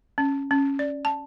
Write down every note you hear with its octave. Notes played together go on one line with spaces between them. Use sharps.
C#4
C#4
D5
A5